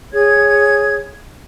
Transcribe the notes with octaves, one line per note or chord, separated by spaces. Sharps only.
G#4 C#5 G#6